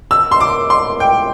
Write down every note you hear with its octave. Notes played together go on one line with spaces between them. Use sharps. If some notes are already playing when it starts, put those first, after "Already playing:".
E6
C6
D6
C6
G5